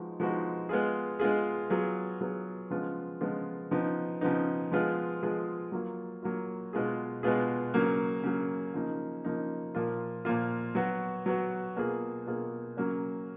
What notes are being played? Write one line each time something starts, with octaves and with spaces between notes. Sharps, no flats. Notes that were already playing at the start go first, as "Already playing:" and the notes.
Already playing: F3 G#3 B3 D#4 F#4
F3 G#3 B3 D#4 F#4
G#3 B3 F4 G#4
G#3 B3 F4 G#4
F#3 B3 F4 G#4
F#3 B3 F4 G#4
C#3 F3 G#3 B3 F4
C#3 F3 G#3 B3 F4
C#3 F3 B3 D#4
C#3 F3 B3 D#4
F3 G#3 B3 F4 G#4
F3 G#3 B3 F4 G#4
F#3 A#3 F4
F#3 A#3 F4
B2 G#3 B3 F4 G#4
B2 G#3 B3 F4 G#4
C#3 F#3 A#3
C#3 F#3 A#3
C#3 F3 A#3 D#4
C#3 F3 A#3 D#4
A#2 F3 A#3 F4
A#2 F3 A#3 F4
F#3 B3 F#4
F#3 B3 F#4
B2 A#3 F4 G#4
B2 A#3 F4 G#4
C#3 F#3 A#3 C#4